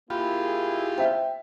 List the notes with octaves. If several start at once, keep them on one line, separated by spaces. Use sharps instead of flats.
A#3 E4 F4 G4 G#4 B5
C5 E5 G5